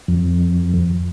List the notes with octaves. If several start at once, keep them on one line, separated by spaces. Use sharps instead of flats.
F2